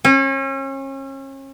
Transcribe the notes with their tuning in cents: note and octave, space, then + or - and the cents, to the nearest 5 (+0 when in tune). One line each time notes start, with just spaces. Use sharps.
C#4 -35